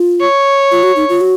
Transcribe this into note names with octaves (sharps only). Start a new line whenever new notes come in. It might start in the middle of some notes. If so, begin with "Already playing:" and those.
Already playing: F4
C#5
F4
F#4
D#4
F4
F#4